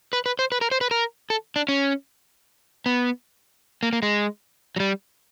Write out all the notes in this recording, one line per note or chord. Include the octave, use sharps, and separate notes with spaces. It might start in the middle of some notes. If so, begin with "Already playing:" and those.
B4
B4
C5
B4
A#4
C5
B4
A#4
A4
D4
C#4
B3
A#3
A#3
G#3
F#3
G3